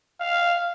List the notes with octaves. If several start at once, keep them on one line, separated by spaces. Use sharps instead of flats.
F5